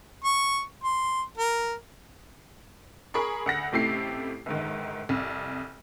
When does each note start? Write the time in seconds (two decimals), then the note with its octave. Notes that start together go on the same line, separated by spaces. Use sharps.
0.24 C#6
0.84 C6
1.38 A#4
3.14 G#4 A#4 B5 C#6
3.46 D2 F#5 A#6
3.72 A1 C3 A3 E4 G4 C7
4.46 G1 G#2 D#3
5.09 C2 F2